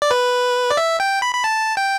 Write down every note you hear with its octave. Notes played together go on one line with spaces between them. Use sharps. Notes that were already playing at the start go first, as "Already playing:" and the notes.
D5
B4
D5
E5
G5
B5
B5
A5
G5